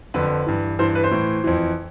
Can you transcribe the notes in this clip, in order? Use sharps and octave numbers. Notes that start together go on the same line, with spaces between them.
F2 D3 F3 B4
G2 E3
G2 E3 C5
B4
C5
A2 E3
F2 E3